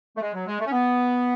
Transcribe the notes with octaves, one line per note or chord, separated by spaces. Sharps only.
A3
G#3
F#3
G#3
A3
C#4
B3